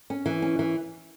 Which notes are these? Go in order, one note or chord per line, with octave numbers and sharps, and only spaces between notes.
C#4
E3
C#4
E3